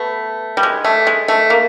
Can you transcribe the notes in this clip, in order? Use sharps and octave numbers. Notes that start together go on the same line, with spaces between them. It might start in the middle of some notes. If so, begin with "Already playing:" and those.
Already playing: A3 B3
G3
G#3
A3
G#3
A3
A#3